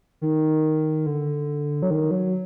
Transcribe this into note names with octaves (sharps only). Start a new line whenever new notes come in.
D#3
D3
F#3
D#3
F#3